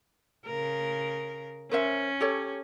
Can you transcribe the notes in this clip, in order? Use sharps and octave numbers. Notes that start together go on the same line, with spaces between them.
C#3 A#4
C#4 A#4 C5 E5
G4 A4 C#5